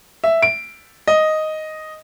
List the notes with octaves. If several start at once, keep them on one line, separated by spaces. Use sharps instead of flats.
E5
D7
D#5